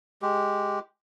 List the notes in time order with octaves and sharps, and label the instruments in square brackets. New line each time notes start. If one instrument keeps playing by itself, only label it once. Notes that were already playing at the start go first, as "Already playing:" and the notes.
[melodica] G#3 G4